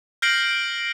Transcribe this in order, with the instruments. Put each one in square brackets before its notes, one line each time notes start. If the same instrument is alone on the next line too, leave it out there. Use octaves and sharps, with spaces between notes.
[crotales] F6 G6 A#6 C7 D7 F#7